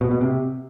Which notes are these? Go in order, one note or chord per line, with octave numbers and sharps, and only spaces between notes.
B2
B2
C3